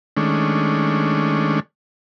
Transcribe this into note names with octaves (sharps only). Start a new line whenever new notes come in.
D#3 G#3 A3 C#4 D4